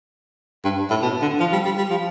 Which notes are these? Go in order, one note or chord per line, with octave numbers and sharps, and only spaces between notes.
G2
A2
B2
D3
F3
G3
G3
G3
F3